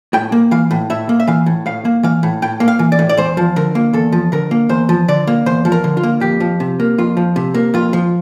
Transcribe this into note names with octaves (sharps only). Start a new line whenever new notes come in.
A2 G5
A#3
E3 F5
A2
A2 E5
A#3
E5
E3 F5
A2
A2 F5
A#3
E3 F5
A2
A2 G5
A#3
F5
E3
D5
A2
D5
E2 C5
F3
D3 A#4
A#3
E2 A4
F3
D3 A#4
A#3
E2 C5
F3
D3 D5
A#3
E2 C5
F3
A#4
D3
F4
A#3
F2 G4
F3
C3
A#3
F2 F4
F3
C3
A#3
F2 F4
F3